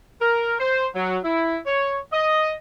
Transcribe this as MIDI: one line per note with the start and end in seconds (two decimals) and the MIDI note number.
0.21 0.54 70
0.59 0.87 72
0.95 1.18 54
1.24 1.57 64
1.66 1.98 73
2.13 2.54 75